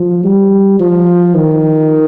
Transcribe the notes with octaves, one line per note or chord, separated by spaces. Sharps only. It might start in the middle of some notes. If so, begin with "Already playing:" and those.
Already playing: F3
G3
F3
D#3